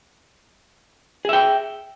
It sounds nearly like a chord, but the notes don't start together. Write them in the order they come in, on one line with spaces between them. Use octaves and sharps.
G#4 E5 G5